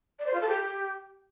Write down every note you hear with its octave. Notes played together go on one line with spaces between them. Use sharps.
D5
C5
F4
A4
G4